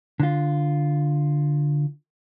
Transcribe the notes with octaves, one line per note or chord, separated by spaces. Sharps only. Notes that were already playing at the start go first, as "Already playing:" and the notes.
D3 F4